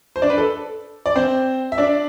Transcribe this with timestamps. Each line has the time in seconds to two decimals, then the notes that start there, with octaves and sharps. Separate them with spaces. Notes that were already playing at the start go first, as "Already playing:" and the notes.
0.16 C5
0.22 D4 D5
0.30 B4
0.38 A4
1.06 D5
1.16 C4 C5
1.72 E5
1.78 D4 D5